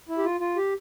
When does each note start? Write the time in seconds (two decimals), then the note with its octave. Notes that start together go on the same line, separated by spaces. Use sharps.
0.09 E4
0.18 G4
0.24 F4
0.40 F4
0.57 G4